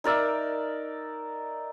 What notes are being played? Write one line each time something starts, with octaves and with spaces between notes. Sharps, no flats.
D#4 A#4 D5 E5